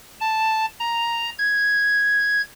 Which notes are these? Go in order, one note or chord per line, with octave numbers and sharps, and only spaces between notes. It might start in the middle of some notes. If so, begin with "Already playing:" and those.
A5
A#5
G#6